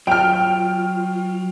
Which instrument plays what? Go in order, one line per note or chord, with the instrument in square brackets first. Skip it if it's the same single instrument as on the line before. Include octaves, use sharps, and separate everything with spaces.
[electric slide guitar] F#3 F4 [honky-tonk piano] G5 F6